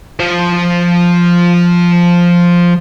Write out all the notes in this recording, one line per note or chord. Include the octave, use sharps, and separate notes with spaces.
F3 C5